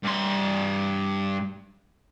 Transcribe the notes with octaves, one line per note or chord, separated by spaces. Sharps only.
G2 C6